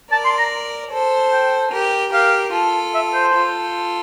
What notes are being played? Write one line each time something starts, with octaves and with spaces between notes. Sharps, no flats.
A#4 D5 A5
C6
A#5
A4 C5
G5
G4 A#4
G4 A#4 F5
F4 A4
E5
C5
F4 A4